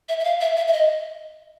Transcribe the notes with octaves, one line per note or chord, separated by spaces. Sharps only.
E5
E5
F5
E5
E5
E5
D#5